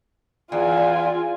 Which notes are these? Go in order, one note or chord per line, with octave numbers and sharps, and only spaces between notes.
E2 F4 G#5